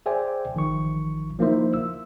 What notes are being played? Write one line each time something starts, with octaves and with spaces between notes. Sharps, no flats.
G#4 C5 D5 E5 G5 G#5
G#1 D#3 F3 C#6
F3 A#3 D#4 E4 C5 E5
E6